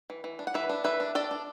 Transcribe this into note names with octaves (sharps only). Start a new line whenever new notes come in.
E3
E3
D4
F#5
E3 B4 E5
D4
E3 B4 E5
D4
D4 A4 D5
D4